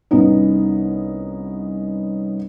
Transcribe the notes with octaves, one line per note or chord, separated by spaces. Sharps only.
C2 B3 C#4 D#4